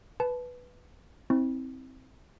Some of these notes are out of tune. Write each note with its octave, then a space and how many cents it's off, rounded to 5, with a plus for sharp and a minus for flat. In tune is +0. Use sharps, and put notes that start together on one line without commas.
B4 +0 A5 -25
C4 +0 E4 -40